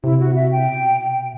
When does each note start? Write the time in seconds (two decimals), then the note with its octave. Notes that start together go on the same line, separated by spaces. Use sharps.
0.04 C3 E4
0.20 F#4
0.36 E5
0.52 G5
0.67 B2